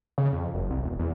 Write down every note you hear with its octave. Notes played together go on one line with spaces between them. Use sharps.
C#3
F2
F#1
C2
E1
E2